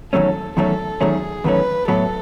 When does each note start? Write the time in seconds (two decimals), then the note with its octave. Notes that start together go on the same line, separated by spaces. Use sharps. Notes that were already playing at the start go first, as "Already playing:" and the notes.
0.13 E2 D#3 F#3 A3 C#4 A4
0.57 E2 D#3 F#3 A3 C#4 A4
1.00 E2 D#3 F#3 A3 C#4 G#4
1.44 E2 D#3 F#3 A3 C#4 B4
1.88 A2 F#3 B3 A4